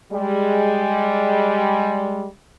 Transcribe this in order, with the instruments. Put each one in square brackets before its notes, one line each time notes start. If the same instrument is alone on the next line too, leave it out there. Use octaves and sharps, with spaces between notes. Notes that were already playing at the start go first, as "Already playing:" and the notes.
[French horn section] G3 G#3